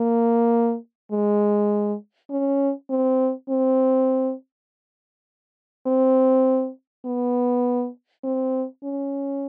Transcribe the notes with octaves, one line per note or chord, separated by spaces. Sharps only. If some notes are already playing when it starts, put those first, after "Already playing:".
Already playing: A#3
G#3
C#4
C4
C4
C4
B3
C4
C#4